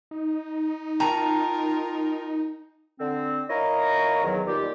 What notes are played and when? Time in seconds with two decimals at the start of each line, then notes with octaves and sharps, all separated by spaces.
0.11 D#4
1.00 F4 A#4 G5 A5 A#5
3.00 D3 C4
3.50 E4 A#4 C#5 D#5 F5 A#5
4.24 E2 D#3 F#3
4.47 D#2 A#2 G3 G4